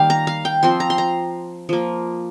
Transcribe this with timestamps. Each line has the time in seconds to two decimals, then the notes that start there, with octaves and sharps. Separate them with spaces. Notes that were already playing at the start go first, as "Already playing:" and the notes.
Already playing: D#3 G3 A#3 F5 G5
0.10 A#5
0.27 F5
0.45 G5
0.63 F3 C4 C6
0.80 A#5
0.90 C6
0.98 A#5
1.69 F3 A#3